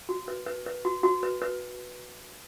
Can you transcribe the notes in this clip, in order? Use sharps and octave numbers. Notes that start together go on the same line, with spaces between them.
F#4
B4
B4
B4
F#4
F#4
B4
B4